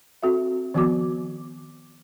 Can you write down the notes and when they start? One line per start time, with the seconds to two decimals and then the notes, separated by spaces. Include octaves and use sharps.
0.23 C4 F#4 A4 E5
0.74 D#3 F3 B3 F#4 D6